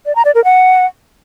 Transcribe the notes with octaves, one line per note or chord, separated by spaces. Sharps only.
D5
A#5
D5
A#4
F#5